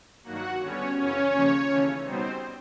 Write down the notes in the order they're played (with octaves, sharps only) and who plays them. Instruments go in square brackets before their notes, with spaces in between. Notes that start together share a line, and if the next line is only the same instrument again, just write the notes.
[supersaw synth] G2 D#3 F#3 A#3 F#4 F#5
D3 G3 B3 C#4 C#5
F#2 C#3 E3 C#4 C#5
D#2 C#3 F3 A#3 C#4
D#2 C#3 E3 A3 C#4
B2 G3 B3 C4 D#4 C5